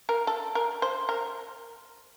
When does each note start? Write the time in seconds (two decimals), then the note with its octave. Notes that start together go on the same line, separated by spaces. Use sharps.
0.09 A#4
0.27 A4
0.55 A#4
0.82 C5
1.09 A#4